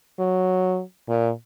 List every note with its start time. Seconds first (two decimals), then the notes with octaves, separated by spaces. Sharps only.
0.19 F#3
1.09 A#2